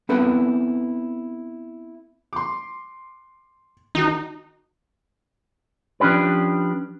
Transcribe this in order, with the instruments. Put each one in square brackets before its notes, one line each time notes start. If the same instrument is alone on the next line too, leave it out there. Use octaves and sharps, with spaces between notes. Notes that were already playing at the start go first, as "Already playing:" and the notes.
[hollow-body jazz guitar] B3 C4 E4 A4 B4
[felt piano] C6 D6
[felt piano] D#3 F#4 [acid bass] D#4
[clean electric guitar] F3 C#4 D4 G4 B4